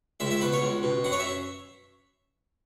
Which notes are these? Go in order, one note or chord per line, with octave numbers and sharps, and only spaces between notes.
C#2 E5
E5
B2 B4
C#5
C#2
B2
F#2 F#5
C#5
E5